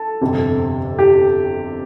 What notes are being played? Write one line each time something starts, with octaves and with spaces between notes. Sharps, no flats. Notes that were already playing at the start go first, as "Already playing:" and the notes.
Already playing: A4
G1 F2 C3
G4